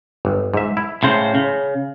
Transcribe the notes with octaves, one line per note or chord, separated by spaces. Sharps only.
G1
G#2 E5
E4
A2 C#3 C5
C#3